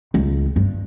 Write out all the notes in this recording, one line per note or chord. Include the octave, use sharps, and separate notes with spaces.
C#2
G2